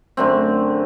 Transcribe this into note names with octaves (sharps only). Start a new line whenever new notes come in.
F#2 D3 A3 C4